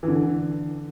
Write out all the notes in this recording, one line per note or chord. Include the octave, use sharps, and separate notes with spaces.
E3
D3